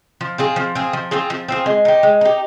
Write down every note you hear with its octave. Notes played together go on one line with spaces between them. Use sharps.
F3
C4 F4 G#4
F3
C4 F4 G#4
F3
C4 F4 G#4
F3
C4 F4 G#4
G#3
D#4 G4
G#3
D#4 G4